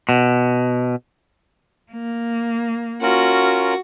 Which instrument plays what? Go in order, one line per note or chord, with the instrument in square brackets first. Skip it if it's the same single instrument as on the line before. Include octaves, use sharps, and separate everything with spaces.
[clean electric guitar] B2
[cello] A#3
[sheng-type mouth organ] C#4 F4 A#4 [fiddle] F#4